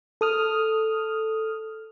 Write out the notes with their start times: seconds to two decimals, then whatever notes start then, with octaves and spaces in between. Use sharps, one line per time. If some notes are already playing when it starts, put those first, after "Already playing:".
0.21 A4 D#6 F6